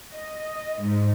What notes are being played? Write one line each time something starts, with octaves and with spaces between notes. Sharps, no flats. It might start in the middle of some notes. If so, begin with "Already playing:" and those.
D#5
G#2